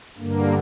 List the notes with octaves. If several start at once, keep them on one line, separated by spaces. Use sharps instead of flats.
G2 D3 A#3